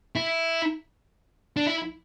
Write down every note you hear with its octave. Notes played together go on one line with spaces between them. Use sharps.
E4
D4
E4